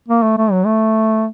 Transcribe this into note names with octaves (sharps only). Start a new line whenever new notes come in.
A#3
A3
A3
F#3
A3